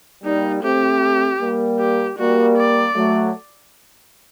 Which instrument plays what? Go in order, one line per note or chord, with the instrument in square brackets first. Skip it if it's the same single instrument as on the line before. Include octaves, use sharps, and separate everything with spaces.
[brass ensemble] G3 A#3 [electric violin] D#4
[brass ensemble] A3 C4 [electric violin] G4
[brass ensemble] G3 A#3
[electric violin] G4
[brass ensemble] G3 A#3 [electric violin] F#4
[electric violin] D5
[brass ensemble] F#3 A3